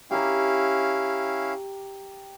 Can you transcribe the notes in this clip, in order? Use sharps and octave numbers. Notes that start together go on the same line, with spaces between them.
C#4 E4 G4 F5 A#5